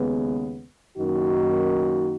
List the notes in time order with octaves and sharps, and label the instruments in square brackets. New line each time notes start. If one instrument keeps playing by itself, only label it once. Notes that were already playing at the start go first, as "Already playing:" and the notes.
Already playing: [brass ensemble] D#2 C#3 G#3 B3
F#2 D#3 A#3 D#4 F#4